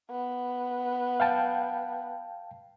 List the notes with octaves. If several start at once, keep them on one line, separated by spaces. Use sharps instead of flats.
B3
F5 G5 A5